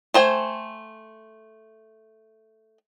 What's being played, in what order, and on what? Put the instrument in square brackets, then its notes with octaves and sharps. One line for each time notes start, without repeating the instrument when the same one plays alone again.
[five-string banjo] A3 C5 G5 G#5